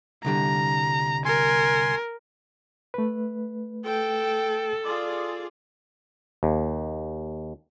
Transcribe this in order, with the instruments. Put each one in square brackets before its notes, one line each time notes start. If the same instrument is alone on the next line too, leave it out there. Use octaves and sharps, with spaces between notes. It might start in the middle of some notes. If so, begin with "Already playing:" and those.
[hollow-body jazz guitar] C2 D3 G3 [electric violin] A#5
[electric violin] A#4 [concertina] G#5 C6
[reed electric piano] A3 B4
[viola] A4 [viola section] G5
[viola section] F4 G#4 D5
[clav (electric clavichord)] D#2